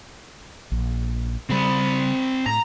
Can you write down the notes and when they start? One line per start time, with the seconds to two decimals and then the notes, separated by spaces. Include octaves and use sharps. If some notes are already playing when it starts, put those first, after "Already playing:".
0.72 A#1
1.50 C#3 G3 C4 B5
2.46 A2 A#5